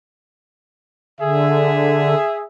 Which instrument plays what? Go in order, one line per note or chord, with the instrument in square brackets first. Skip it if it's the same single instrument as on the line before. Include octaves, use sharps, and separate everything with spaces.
[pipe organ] D3 [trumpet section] G#4 E5